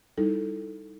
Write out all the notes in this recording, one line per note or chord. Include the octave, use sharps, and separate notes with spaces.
G3 D#4 E4 A4